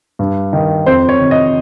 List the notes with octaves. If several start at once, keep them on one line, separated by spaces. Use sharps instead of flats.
G2
D#3
F2 C5
C#5
C3 D#3
D#5